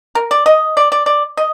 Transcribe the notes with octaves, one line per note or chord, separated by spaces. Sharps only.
A#4
D5
D#5
D5
D5
D5
D#5